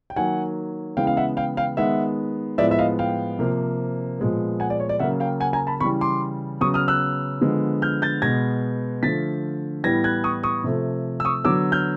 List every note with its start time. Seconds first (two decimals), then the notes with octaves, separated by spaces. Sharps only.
0.10 G5
0.16 D#3 F#3 A#3 F#5 G#5
0.97 C#3 E3 G#3 B3 F5 G5
1.07 F5
1.17 E5 F#5
1.37 F5 G5
1.57 F5 G5
1.77 D#3 G#3 B3 E5 F#5
2.58 A2 F3 G#3 B3 D5 E5
2.71 E5
2.79 D#5 F5
2.99 F5 G5
3.39 C3 F3 A#3
4.19 A#2 F3 G#3 B3
4.60 F#5 G#5
4.70 D5
4.80 C#5
4.89 D5
4.99 C#3 F#3 A#3 E5 F#5
5.20 F5 G5
5.40 F#5 G#5
5.53 G#5 A#5
5.67 A5 B5
5.80 C#3 E3 G3 B5 C#6
6.01 C6 D6
6.61 C#3 F#3 B3 C#6 D#6
6.74 D#6 F6
6.88 E6 F#6
7.41 D3 F3 G#3 B3
7.82 F6 G6
8.02 G6 A6
8.22 B2 G#3 B3 G#6 A#6
9.03 D3 F3 A3 A6 B6
9.83 A2 E3 G3 B3 G#6 A#6
10.04 F#6 G#6
10.24 C#6 D#6
10.43 C#6 D#6
10.64 C3 F3 A3
11.20 E6
11.25 C#6 D#6
11.44 D3 F#3 B3 D6 E6
11.72 F6 G6